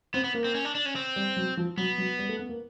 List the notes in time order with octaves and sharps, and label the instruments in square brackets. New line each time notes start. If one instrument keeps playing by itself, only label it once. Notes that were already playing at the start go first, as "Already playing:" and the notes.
[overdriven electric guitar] B3 [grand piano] C4
[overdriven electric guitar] B3
[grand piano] A#3
[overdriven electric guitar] C4
C#4
D4
D4
C#4
C4
[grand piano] G3
F#3
F3
[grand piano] F#3 [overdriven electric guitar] B3
[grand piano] F#3
G3
A3
B3
A#3